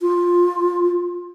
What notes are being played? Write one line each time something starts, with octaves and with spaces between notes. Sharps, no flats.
F4